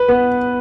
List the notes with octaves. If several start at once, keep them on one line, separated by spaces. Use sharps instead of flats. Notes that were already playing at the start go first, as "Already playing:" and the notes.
Already playing: B4
B3